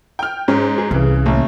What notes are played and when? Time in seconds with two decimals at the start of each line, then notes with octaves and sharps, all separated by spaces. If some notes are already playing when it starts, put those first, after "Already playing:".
0.19 G5 F6
0.48 G#2 C#4
0.78 G#4
0.91 C2 C#3 E3
1.26 A1 D#2